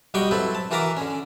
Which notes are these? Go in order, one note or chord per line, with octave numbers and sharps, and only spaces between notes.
B1 G3 F#4 D#5 G5 C#6
F#3 C4 E4 A4 B4
A5
E3 F#4 A#4 E5 A#5 D6
D3 C#4